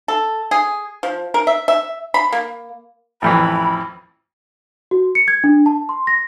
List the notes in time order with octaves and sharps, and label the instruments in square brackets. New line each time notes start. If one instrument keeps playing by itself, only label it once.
[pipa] A4
G#4
F3
A#4
E5
E5
B5
A#3
[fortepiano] A1 F2 E3 [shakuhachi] B5
[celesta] F#4
C#7
G#6
D4
A5
C6
A#6